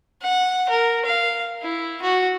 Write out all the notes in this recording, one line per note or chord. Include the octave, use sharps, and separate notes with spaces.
F#5
A#4
F5
E4
F#4